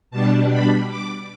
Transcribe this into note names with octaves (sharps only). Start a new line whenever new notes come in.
B2 G3 D4 A5
B5
D6